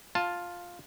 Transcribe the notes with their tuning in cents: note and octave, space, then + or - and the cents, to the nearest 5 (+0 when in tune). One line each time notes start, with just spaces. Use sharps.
F4 +5 A5 +0